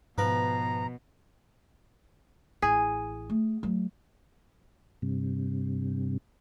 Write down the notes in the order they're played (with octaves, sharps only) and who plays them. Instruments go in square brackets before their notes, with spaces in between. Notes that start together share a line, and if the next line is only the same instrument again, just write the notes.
[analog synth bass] G#2 [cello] B2 [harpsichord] F3 B4 [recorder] A#5
[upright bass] A1 E4 [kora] G#4
[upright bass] A3
F#3 A3
[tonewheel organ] G2 C3